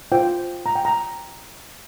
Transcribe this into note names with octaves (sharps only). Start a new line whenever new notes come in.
F4 C5 G5
A#5
G5
A#5